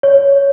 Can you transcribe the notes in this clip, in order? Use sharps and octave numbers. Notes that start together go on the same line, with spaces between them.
C#5